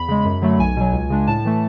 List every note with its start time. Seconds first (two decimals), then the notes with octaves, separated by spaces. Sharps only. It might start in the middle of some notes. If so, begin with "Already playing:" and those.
Already playing: E2 B5
0.08 C#3 G#3
0.25 F#2
0.42 D3 F#3 A3
0.59 B1 G#5
0.76 B2 F#3
0.93 C#2
1.10 C#3 G#3 D4
1.27 A2 A5
1.45 E3 A3